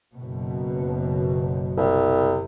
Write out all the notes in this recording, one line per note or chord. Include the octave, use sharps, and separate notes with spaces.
F#1 F#2 B2
C2